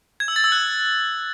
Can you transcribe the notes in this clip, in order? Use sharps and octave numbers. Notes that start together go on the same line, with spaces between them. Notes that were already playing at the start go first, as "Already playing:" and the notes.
G#6
E6
A6
E6
F#6